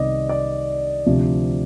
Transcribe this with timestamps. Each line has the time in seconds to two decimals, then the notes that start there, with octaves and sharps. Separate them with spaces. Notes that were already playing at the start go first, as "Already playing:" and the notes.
Already playing: C2 C3 D#3 D5 D#5
0.29 D5
1.06 D2 C3 F3